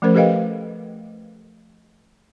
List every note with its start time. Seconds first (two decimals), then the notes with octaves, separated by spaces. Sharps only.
0.02 F3 A3 C#4 A#4 C5
0.15 G4 A4 B4 D#5 F5 G5